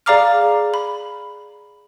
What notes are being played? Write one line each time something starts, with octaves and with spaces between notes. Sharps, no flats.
G#4 D5 F5 A#5 D6 F6
B5